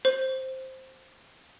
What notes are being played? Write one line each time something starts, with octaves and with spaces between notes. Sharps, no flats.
C5